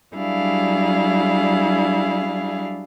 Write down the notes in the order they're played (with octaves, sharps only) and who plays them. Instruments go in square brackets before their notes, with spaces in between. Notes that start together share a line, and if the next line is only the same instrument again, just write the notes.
[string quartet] F#3 G3 D4 E4 G#4 F5